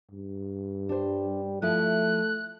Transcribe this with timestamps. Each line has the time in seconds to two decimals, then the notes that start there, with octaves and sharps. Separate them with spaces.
0.11 G2
0.89 G3 D4 C5
1.62 F3 A3 E4 F#6